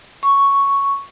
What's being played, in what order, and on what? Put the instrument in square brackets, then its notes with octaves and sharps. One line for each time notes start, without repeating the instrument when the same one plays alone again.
[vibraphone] C#6